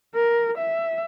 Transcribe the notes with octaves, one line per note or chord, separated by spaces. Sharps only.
A#4
E5